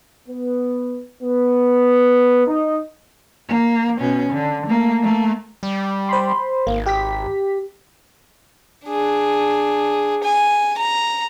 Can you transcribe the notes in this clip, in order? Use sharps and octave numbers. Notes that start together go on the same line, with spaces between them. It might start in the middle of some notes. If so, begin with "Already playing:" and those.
B3
B3
D#4
A#3
B2 C#4
D3
A3 A#3
A3 A#3
G3
C5 B5 C6
G#1 A#3
G4 B6
D4 G#4
G#5
A#5